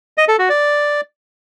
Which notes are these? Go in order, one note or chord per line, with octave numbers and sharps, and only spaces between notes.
D#5
A4
F#4
D5